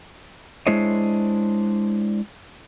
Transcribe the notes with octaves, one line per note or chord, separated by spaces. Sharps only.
G#3 D4 E4 C5 C#5 D#5